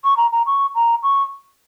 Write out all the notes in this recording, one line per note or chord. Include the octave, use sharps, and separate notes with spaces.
C#6
A#5
A#5
C#6
A#5
C#6